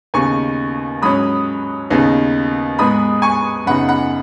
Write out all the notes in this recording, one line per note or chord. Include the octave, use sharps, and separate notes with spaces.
D#2 C#3 B3 D#4 G#5 C#6
G#2 F#3 C#4 B5 D#6
D#2 C#3 B3 D#4
G#2 G#3 B3 B5 D#6
G#5 C#6
F#2 C#3 B3 D#4 F#5 B5
F#5 B5